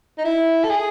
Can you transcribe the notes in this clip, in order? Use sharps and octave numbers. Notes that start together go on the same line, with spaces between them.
D#4
E4
A4
G#4